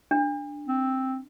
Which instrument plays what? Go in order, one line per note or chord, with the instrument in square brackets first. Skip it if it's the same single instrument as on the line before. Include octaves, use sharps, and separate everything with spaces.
[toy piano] D4
[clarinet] C4